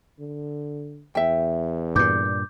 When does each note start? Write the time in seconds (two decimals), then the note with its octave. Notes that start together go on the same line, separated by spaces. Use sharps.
0.19 D3
1.15 E2 E5 G5
1.96 G2 A#2 D6 G6